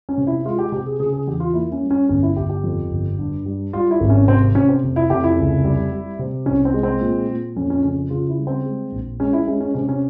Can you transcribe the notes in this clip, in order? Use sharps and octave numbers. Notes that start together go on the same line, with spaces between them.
C#4
C3
E4
G#3 F4
G4
C3 G4
G#4
C#3 G#4
G#4
E2 G4
F4
A#3 E4
C#4
G3
C#4
G1 C#4
E4
G1 G4
G4
F2
G1
G2
G3
G3 F4
E4
G#1
C#4
C3 C4
C3 C#4
C4
F1
E4
F1 G4
E4
C#2
G3
G3
C3
C2 C#4
C4
G#3
C4
A#2
A#2
F2 C#4
C#4
C#3 C#4
C#3 F4
E4
G3
C4
G#3
A#1
G#3 C#4
E4
G#3 C#4
C#4
C3 C#4
C#4